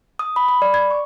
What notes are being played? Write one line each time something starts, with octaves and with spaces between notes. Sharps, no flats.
D#6
B5
B5
D5
G#6
C#6